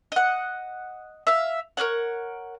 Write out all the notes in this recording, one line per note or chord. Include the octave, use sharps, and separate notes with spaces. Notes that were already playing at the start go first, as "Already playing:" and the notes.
D#5 F#5
E5 F5
A#4 B4 C#5 F#5